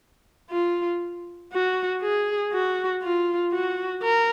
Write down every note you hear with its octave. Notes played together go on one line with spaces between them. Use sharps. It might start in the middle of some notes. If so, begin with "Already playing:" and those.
F4
F#4
G#4
F#4
F4
F#4
A#4